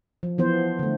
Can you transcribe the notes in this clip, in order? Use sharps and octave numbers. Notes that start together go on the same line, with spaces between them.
F3
E3 F3 B3 C5
D3 A3